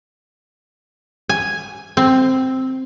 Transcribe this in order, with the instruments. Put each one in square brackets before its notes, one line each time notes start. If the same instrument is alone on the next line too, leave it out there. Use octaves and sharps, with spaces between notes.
[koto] G#5
C4